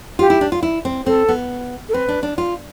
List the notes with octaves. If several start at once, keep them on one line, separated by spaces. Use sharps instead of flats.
F4 G4
E4
D4
F4
E4
C4
C4 A4
B3
A4
C4 B4
D4
D4
F4